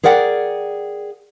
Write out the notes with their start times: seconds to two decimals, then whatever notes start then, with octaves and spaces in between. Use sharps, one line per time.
0.04 G#4 A#4 D5 F#5 G5